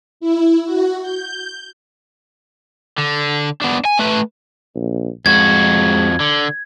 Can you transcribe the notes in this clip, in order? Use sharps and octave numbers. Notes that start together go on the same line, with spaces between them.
E4
F#4
G6
D3
B3 D4
G#5
A3 B4
A#1
F2 G#3 F#4 G#6
D3